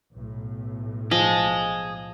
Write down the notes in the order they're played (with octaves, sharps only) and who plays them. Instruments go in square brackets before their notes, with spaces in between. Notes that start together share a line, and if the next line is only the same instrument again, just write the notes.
[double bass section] B1 A2
[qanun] F3 [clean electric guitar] G#4 D#5